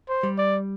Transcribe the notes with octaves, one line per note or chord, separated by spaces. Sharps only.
C5
G3
D5